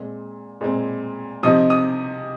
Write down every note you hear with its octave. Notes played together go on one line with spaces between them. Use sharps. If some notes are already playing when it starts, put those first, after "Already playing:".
Already playing: A#2 G#3 C4
A#2 G#3 C4
C3 F3 C4 D#4 D#6
D#6